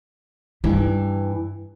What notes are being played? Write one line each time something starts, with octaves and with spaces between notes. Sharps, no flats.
G2 E3 G3 D#4